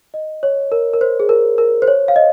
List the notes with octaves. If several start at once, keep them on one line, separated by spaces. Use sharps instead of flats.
D#5
C#5
A#4
A#4
C5
G#4
A#4
A#4
C5
C#5
F5
D#5